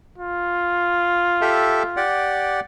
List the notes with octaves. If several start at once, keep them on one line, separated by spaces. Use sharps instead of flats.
F4
G4 A4 E5
G4 D5 F#5